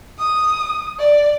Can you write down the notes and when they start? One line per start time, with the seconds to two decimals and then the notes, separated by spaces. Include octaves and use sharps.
0.18 D#6
0.99 D5